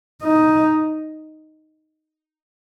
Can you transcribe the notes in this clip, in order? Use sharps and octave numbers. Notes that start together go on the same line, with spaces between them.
D#4